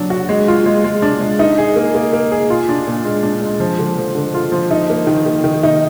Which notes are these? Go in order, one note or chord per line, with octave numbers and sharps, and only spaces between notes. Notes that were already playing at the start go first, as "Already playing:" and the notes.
Already playing: F#3 D4
F#4
G#3
F4
G#3
G#3
D4
G#3
D#4
G#4
A#3
A#3
A#3
G#4
F4
D4
A#2
G#3
D4
G#3
F3
D3
F3
D3
F4
F3
D#4
A#3
D#3
D#3
D#3
D#4